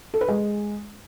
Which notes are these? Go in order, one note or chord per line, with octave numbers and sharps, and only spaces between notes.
A4
B4
G#3